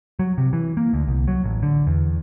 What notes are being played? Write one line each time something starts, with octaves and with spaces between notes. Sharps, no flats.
F#3
C3
E3
A#3
D2
C2
F#3
A1
D3
E2